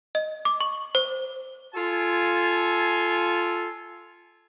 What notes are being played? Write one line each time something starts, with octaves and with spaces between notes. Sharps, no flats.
D#5
D6
C#6
C5
F4 A4 G#5